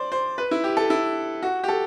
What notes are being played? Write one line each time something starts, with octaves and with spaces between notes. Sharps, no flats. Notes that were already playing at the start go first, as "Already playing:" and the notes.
Already playing: C5 D5
C5
B4
E4
G4
A4
E4
F#4
G4
A4